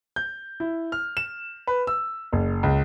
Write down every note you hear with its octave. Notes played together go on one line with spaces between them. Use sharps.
G6
E4
F6
E7
B4
E6
F#1
C#2